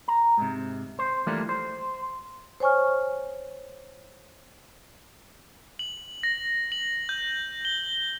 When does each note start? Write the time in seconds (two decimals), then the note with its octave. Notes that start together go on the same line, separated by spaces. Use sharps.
0.08 A#5
0.38 G#2 C3
0.99 C5
1.27 E3 F3 G3 A3 A#3 D4
1.49 C5
2.60 C5 C#5 G#5 C#6 F6
5.79 F#7
6.23 A#6
6.72 F#7
7.09 G6
7.65 G7